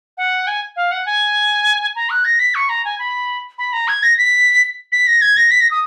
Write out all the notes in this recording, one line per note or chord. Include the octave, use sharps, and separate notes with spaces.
F#5
G#5
F5
F#5
G#5
A#5
F#6
A#6
B6
C#6
A#5
G#5
B5
B5
A#5
G#6
A#6
B6
B6
A#6
G#6
A#6
B6
A#6
D#6